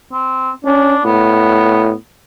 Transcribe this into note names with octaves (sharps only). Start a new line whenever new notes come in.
C4
C#4 D4
A2 B3